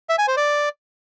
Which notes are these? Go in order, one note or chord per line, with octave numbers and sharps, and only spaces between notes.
E5
G#5
C5
D5